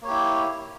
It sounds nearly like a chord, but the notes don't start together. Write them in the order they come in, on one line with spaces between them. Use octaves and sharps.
A#3 C#5 G4 E4